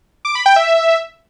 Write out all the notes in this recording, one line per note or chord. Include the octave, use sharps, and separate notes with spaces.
D6
B5
G5
E5